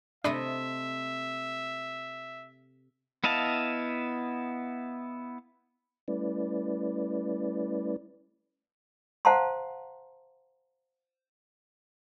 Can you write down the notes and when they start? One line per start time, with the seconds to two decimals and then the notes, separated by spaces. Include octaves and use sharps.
0.24 C3 A3 D4 D#5 E5 B5
3.24 B3 E4 D#5 F5 A5
6.08 G3 A3 C#4 E4 B4 D5
9.25 C5 F5 F#5 A5 A#5 C6